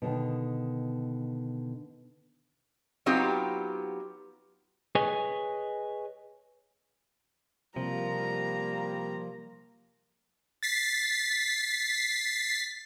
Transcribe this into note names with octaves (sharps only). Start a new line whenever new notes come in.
B2 D3 D#3
F#3 B3 C4 D#4 F4 G4
G#4 B4 C#5 D#5 G#5
C3 F3 G3 A#3 A#5
A6 B6 C7